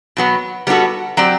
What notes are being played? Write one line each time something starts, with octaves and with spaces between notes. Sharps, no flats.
B2 F#3 B3
G3 B3 D4 F#4 A4
F#3 C4 G4 D5